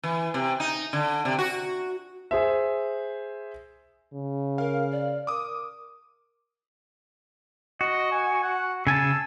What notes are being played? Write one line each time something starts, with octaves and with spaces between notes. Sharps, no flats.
E3
C3
D#4
D3
C3
F#4
G#4 C5 E5
C#3
A#4 F5
D5
A#4 D6 D#6
F#4 D#5
G#5
F#5
C#3 G#5 A5 E6